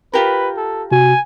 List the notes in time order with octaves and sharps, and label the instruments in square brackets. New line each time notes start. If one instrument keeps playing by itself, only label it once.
[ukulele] F4 G4 A#4 [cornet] B4
[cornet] A4
[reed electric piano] C3 F#4 [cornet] G#5